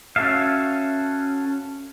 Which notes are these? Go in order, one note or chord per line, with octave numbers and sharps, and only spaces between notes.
C#4 F#4 A4 E5 F5